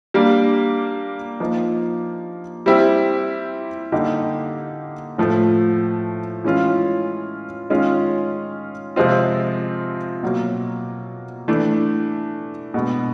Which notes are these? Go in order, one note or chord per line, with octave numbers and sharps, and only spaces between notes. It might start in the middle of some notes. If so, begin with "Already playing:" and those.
G3 A#3 D4
F3 A#3 D#4
G3 C4 E4 G4
D3 G3 A#3 D#4 G4
A2 F3 A3
E3 G#3 C#4 F4
D#3 G#3 C#4 F4
C3 F3 G#3 C4 F4
B2 F#3 A#3
E3 A3 D4
B2 G#3 B3 D4